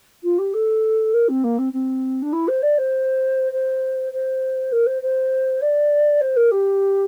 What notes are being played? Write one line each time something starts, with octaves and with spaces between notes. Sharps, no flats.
F4
G4
A4
A#4
C4
A#3
C4
C4
D4
E4
C5
D5
C5
C5
C5
A#4
C5
C5
D5
C5
A#4
G4